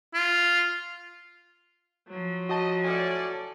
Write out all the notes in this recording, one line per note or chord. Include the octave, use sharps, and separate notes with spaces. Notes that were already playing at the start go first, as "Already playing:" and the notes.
F4
F3 F#3
F#4 D#5 A5
A2 C#4 D5